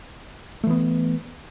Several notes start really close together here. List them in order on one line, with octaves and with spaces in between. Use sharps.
A3 E3 B3